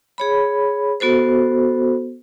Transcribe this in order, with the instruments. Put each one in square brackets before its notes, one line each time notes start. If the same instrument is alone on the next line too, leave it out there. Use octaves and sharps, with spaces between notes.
[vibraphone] G#4 C#5 B5
B3 F#4 A4 C5